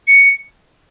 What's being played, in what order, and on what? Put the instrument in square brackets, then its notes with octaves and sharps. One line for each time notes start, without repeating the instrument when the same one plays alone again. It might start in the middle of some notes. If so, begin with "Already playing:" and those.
[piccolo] C#7